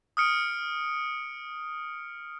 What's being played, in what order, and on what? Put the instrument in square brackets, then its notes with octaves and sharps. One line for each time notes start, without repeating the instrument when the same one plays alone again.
[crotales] D#6 F6 C#7 D7